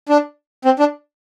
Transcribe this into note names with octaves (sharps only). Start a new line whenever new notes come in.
D4
C4
D4